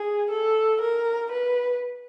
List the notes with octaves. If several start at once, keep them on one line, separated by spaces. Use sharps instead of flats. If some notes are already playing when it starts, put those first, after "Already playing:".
Already playing: G#4
A4
A#4
B4